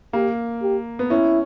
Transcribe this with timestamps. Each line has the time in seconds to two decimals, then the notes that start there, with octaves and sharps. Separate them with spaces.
0.13 A#3 G4
0.62 G4
0.99 B3
1.10 C#4 E4